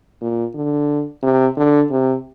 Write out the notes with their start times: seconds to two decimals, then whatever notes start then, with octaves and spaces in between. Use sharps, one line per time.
0.21 A#2
0.55 D3
1.23 C3
1.57 D3
1.91 C3